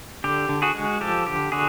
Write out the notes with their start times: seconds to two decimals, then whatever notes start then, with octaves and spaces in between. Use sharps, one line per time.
0.24 D3 G4
0.49 D3
0.62 F#4 G#4
0.75 G#3
1.01 F3 G4 A4
1.27 D3 G4
1.52 D3 F#4 G#4